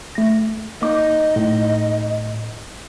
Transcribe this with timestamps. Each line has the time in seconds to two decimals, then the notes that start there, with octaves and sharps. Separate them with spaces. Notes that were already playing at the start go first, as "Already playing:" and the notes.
0.15 A3 A#6
0.82 A#3 D#4 D#5 D6
1.36 A2